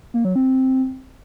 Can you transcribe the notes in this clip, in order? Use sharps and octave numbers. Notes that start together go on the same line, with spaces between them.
A#3
F#3
C4